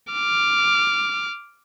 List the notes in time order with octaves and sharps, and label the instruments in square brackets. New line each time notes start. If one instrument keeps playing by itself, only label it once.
[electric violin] D6 F6